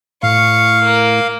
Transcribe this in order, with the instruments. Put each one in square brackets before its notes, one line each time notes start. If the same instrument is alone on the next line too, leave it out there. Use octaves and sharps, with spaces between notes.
[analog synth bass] A2 [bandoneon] F5 [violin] C#6
[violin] A#3